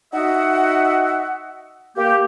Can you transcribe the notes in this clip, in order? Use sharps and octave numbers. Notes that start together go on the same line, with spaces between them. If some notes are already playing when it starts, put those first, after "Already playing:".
D#4 F#4 D#5 E5 F#5
A#3 G4